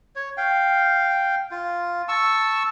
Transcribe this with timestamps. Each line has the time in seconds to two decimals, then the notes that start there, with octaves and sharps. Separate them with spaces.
0.16 C#5
0.37 F5 G5
1.51 F4
2.08 A5 C#6 E6